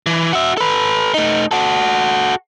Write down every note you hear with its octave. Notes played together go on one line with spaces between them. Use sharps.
E3
F#4 E5
A4 B4
A3 D#4
F#4 A4